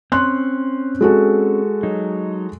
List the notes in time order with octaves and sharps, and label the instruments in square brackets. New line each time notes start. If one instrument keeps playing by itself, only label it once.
[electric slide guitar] C4 C#4 [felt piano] C6 F#6
[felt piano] G#3 F#4 A4
[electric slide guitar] F#3 D#4